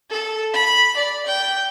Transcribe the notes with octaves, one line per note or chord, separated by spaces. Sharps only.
A4
B5
D5
G5